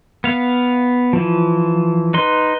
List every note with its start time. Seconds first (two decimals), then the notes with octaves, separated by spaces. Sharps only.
0.24 B3 F5
1.13 E3 F3
2.14 D#4 B4 C6